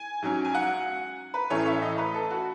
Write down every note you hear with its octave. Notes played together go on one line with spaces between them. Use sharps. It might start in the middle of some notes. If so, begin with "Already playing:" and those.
Already playing: G#5
G#2 F#3 C#4
G#5
F#5
B4
A2 E3 A3 C#4 C#5
E5
D#5
B4
A4
F#4